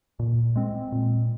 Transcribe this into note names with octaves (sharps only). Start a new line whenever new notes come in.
A#2
G#3 C4
A#2